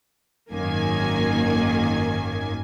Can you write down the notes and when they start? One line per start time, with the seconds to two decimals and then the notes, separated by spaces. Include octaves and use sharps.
0.51 G#1 F#2 D#3 A#3 G#5